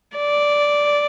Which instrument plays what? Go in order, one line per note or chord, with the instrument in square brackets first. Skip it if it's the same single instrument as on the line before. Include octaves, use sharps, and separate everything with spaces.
[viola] D5